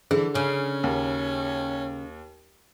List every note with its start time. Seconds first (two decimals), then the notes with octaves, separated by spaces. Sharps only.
0.11 D3 E3 G#4
0.35 C#3 C#4
0.84 D#2